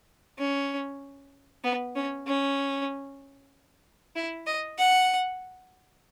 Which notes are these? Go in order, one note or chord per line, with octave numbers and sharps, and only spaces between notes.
C#4
B3
C#4
C#4
E4
D#5
F#5